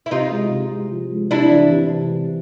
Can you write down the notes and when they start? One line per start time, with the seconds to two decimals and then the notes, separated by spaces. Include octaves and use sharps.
0.06 E4
0.11 C3 D#4 F4
0.32 G#3
0.51 C3
0.71 G#3
0.92 F3
1.11 G#3
1.31 C3 D4 E4
1.51 E3
1.71 C3
1.91 E3
2.11 C3